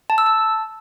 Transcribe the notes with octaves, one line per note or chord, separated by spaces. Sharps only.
A5
E6
A5